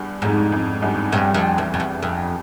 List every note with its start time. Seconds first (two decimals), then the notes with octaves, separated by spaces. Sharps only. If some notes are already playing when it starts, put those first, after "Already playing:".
Already playing: E2 G2
0.22 F2 G#2
0.52 F2
0.82 E2 G2
1.12 G2
1.34 F2
1.58 E2
1.74 F2
1.80 E2
2.03 F2